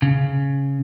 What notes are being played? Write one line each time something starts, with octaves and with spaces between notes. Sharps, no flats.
C#3